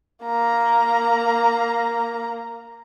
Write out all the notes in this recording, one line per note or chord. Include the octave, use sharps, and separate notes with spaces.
A#3 A#5